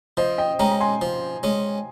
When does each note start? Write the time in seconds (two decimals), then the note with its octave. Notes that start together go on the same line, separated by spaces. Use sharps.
0.17 F3 C5 D#5
0.38 D#5 G5
0.59 G#3 C#4 G5 A#5
0.72 A#5
0.80 G#5 C6
1.02 F3
1.43 G#3 C#4